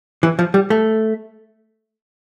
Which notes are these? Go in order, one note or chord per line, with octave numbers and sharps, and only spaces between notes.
E3
F3
G3
A3